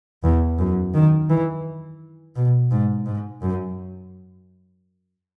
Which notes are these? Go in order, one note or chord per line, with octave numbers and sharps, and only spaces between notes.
E2
F#2
D#3
E3
B2
G#2
G#2
F#2